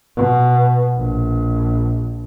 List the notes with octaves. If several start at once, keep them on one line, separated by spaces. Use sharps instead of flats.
B2
A#1